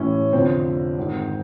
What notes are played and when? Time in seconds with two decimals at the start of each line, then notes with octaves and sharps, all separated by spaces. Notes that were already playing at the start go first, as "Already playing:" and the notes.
Already playing: A1 A2 E3 C#4
0.33 F1 F2 D3 C4
0.97 G#1 G#2 D#3